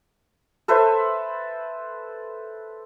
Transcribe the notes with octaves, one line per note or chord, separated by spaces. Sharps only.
A4 B4 C5 E5